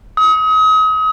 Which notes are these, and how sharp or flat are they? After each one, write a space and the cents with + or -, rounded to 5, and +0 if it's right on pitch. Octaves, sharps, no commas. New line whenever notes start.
D#6 +35